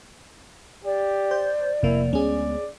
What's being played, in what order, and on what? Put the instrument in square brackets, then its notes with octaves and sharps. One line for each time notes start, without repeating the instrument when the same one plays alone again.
[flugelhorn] G4 [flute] D5
[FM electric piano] C5 G6
[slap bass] F1 [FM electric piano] C3 A#3 [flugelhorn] E4
[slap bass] D2 G#3 B3 [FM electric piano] C#4 G#4 [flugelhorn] D5